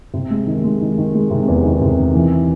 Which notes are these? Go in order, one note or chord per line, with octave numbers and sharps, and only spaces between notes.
C3
G#3
D#3
G#3
D#3
D#3
G#3
C3
E2
D#3
C3
D#3
E3